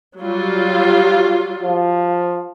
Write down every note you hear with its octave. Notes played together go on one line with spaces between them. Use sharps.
F#3 G3 F4
F3